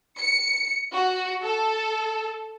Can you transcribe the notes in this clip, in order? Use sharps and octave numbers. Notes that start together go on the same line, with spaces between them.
C#7
F#4
A4